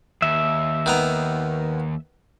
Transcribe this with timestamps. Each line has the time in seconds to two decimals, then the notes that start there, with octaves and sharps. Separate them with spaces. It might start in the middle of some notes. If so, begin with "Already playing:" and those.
0.22 D#2 E5
0.86 D#3 B3 A#5